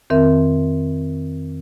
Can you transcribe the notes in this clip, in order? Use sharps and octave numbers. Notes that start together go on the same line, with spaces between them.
F2 D#3 C4 A#4 E5